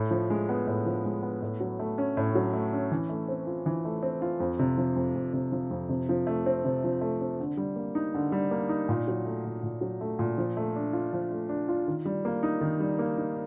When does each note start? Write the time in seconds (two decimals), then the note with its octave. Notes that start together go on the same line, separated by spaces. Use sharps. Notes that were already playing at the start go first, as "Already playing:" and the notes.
Already playing: A2
0.11 F3
0.30 G#3
0.49 B3
0.67 A2
0.86 F3
1.05 G#3
1.23 B3
1.42 A2
1.60 F#3
1.79 A3
1.98 C#4
2.17 A2
2.35 F#3
2.53 A3
2.73 C#4
2.92 E3
3.09 A3
3.28 C4
3.47 F4
3.66 E3
3.85 A3
4.03 C4
4.22 F4
4.40 F2
4.59 C3
4.78 F3
4.96 F2
5.15 F2
5.33 C3
5.52 F3
5.71 F2
5.89 C3
6.09 F3
6.27 A3
6.46 C4
6.65 C3
6.84 F3
7.01 A3
7.21 C4
7.40 D3
7.57 G3
7.76 A#3
7.95 D#4
8.14 D3
8.32 G3
8.51 A#3
8.69 D#4
8.89 A#2
9.08 F#3
9.25 A3
9.45 A#2
9.63 A#2
9.81 F#3
10.01 A3
10.19 A#2
10.38 F3
10.57 A3
10.76 D4
10.93 F4
11.13 F3
11.31 A3
11.49 D4
11.68 F4
11.88 D#3
12.05 G3
12.25 A#3
12.43 D#4
12.61 D#3
12.80 G3
12.99 A#3
13.18 D#4